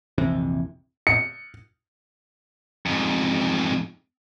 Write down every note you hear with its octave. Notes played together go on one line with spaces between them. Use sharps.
A#1 F2 C3 E3
C#7
F2 G#2